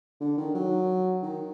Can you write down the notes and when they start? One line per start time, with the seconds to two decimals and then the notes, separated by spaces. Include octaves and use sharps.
0.20 D3
0.37 D#3
0.54 F#3
1.23 D#3